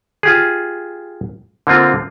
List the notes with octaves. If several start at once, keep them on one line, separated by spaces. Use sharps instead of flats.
F4 G4 G#4
D3 A#3 C4 F4